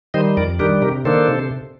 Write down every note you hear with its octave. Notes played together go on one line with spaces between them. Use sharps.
D#3 G3 C5 D#5
F2 A#4 D5
D#3 G3 D4 G4 A#4
C3 G4 A#4
D#3 A#3 D4 A4 C5
C3